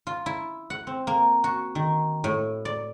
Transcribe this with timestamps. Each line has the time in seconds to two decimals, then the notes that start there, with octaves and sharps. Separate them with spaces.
0.07 F4
0.26 E4
0.70 F#5
0.87 C4
1.07 A#3
1.44 F#4
1.75 D#3
2.24 A2
2.65 D5